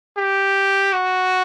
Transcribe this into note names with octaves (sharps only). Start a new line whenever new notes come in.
G4
F#4